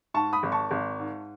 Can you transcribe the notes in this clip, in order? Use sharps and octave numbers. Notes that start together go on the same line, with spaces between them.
G#2 A5 C#6
B5 D#6
G#1
A5 C#6
G#1
G#2